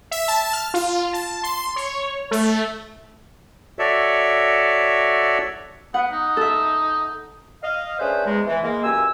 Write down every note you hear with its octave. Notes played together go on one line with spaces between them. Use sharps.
E5
A5
F6
F4
A5
C6
C#5
A3
F#4 A4 C#5 D5 E5
B3 F#5
D#4
A4 E5
D#5 F5
A3 C#4 D4 G#4 B4 C5
E2 G#2 G#3
E3
G#3 A#3
C#2 F#2 G4 G#5 E6